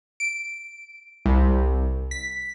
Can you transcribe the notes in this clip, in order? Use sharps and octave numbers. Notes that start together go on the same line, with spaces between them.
D7
C2
B6